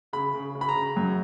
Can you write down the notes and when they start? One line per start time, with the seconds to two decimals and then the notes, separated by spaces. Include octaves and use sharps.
0.13 C#3 B5
0.34 C#3
0.55 C#3
0.61 B5
0.69 A#5
0.76 C#3
0.96 F#2